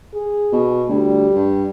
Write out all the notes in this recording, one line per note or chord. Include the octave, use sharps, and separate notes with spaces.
G#4
B2
D2 G3
G2